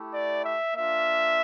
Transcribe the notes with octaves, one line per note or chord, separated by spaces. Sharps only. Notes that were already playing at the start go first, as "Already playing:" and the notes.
Already playing: A3 E4 G4
D5
E5
A#3 D4 F4 E5